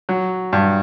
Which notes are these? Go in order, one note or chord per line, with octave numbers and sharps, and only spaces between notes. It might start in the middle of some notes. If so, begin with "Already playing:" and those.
F#3
G2